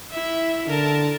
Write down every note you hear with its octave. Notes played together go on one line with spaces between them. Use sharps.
E4 E5
D3 A#4 A5